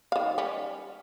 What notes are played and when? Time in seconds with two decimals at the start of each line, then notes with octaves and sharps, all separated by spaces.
0.12 D#3 F5
0.38 G3 C#4